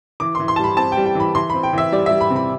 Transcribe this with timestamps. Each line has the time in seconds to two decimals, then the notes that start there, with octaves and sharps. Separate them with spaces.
0.20 E3 D6
0.35 C6
0.40 E3
0.48 C6
0.56 A5
0.59 G3 B5
0.77 C4 A5
0.92 G5
0.97 G3
1.06 G5
1.15 E3 B5
1.35 E3 C6
1.50 C4 B5
1.63 G5
1.73 E3 E5
1.92 G3 D5
2.06 G3 E5
2.21 B5
2.30 C3
2.36 B5